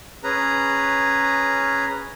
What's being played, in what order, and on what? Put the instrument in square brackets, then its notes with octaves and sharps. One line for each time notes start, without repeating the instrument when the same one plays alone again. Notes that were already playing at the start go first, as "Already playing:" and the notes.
[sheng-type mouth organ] C#4 G#4 B4 A#5